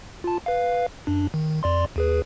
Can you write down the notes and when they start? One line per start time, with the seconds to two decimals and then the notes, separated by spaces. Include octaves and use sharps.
0.24 F4 A5
0.46 B4 F5
1.07 F#2 D4
1.34 D#3
1.63 F2 D5 C6
1.96 D#2 G#4 B4